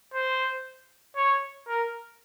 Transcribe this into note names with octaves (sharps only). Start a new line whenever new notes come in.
C5
C#5
A#4